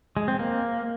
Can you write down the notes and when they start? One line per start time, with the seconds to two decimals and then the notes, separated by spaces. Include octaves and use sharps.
0.17 G#3
0.28 C4
0.39 A#3